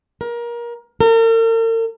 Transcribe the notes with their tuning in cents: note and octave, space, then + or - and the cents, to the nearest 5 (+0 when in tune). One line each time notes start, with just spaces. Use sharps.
A#4 +25
A#4 -45